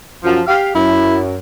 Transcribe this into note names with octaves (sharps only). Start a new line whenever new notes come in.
F#2 F3
G4 F5
F#2 E4